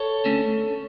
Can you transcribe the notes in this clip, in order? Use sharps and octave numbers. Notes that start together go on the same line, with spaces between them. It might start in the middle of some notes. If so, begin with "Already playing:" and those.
Already playing: A4 C#5
D3 A3 C#4